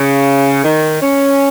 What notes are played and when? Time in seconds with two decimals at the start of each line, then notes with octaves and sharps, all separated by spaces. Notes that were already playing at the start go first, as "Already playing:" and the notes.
Already playing: C#3
0.64 D#3
1.01 C#4